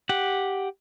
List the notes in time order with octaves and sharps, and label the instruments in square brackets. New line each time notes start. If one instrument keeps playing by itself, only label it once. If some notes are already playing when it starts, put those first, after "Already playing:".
[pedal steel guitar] G4 F#5